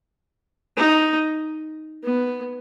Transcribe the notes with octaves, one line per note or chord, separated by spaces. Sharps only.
D#4
B3